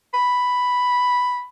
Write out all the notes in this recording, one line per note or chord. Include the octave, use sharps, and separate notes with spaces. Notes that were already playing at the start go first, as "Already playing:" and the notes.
B5